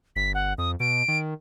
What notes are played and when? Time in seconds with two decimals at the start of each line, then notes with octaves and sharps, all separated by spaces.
0.16 G1 B6
0.35 F#5
0.58 F2 D#6
0.80 B2 D7
1.08 D#3